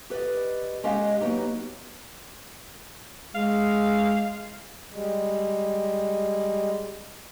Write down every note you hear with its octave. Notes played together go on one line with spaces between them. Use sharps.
G4 B4 C5 D5 D#5
G#3 C#4 G4 D#5 F5 F#5
F#3 A#3 B3 D#4 G4
G#3 F5
G3 G#3